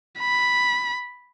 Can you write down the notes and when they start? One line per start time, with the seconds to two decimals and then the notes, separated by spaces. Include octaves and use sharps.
0.20 B5